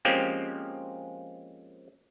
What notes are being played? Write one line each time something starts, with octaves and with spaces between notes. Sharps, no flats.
F3 G#3 A#3 C4 C#4 G4